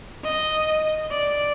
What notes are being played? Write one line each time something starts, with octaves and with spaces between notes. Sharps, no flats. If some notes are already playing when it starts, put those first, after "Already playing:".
D#5
D5